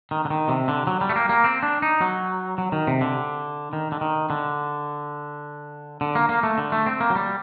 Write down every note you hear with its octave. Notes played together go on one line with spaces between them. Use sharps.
D#3
D3
D#3
C3
D3
F#3
G3
A3
A#3
A#3
C4
D4
D#4
F#3
F#3
D#3
C3
D3
D#3
D3
D#3
D3
D3
A#3
A#3
A3
D3
A3
C4
A#3
F#3
G3